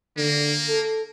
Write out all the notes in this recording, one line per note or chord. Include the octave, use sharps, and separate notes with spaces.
D3 A#3
A4